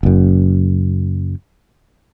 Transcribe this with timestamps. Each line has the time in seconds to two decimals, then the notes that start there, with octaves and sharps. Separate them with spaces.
0.03 F#1 F#2